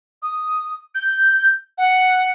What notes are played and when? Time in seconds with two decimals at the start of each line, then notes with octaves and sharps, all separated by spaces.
0.22 D#6
0.95 G6
1.77 F#5